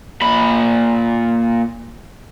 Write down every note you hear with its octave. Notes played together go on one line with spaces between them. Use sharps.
A#2 B5